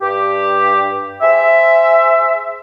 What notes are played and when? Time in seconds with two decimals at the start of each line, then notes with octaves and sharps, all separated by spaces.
0.02 G2 G4
1.22 G#4 C5 E5